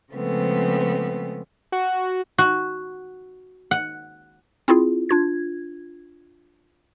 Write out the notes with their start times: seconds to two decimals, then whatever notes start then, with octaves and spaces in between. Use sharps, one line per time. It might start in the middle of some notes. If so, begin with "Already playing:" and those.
0.12 C#3 F3 G#3 A3 B3 C4
1.72 F#4
2.38 F#4
3.71 F#5
4.68 C4 E4 F4 G#4
5.09 D4 F4 G#6